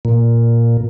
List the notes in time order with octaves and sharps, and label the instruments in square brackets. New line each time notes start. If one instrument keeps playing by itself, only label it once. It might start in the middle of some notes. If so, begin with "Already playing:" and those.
[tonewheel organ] A#2